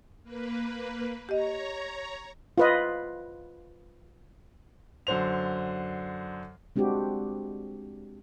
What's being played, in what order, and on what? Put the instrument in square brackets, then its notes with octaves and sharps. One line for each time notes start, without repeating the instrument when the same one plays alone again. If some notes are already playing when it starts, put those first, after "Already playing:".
[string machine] A#3 B4
[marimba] G4 D#5 [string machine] C#5 A#5
[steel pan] F4 B4 D#5
[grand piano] F#2 D3 C5 F7
[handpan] G#3 C4 D4 F#4 G4